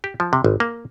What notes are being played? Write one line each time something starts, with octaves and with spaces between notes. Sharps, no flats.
G4
F3
C3
G#1
A#3